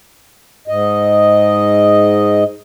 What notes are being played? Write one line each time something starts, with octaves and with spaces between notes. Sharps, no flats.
G#2 D#5